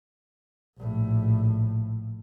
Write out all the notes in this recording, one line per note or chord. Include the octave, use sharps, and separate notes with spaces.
A#1 A2